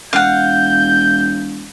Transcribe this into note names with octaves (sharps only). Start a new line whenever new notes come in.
E1 F5 F#5 G6